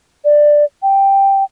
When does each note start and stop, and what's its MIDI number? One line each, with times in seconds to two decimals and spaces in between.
0.24 0.64 74
0.82 1.44 79